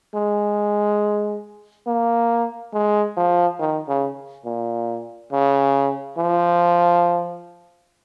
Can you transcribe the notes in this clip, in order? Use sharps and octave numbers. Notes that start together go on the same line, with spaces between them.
G#3
A#3
G#3
F3
D#3
C#3
A#2
C#3
F3